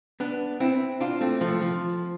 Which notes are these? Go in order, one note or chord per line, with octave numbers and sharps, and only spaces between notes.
B3 D4
C4 E4
D4 F4
A3 C4
F3 A3
F3